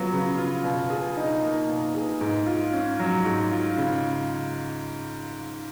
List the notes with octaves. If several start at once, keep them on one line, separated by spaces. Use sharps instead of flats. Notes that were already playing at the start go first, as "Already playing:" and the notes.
Already playing: C#3 F#3 B3 F4
C#3
F4
B2
G#4
D#4
A#3
B2
G#4
G#2
F4
C#4
F#3
G#2
F4
C#3